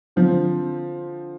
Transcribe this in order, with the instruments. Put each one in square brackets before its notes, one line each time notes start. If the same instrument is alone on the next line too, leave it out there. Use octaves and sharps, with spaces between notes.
[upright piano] D3 F3 C4